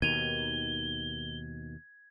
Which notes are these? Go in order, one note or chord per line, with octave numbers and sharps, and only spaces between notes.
D#2 B2 D#3 G#6 D#7 F7 G7